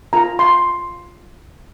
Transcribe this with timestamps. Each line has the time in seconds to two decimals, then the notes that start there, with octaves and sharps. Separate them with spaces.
0.13 F4 A#4 A#5
0.39 C6